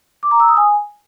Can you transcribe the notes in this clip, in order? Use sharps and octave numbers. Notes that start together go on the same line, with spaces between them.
D6
A#5
E6
D#6
G#5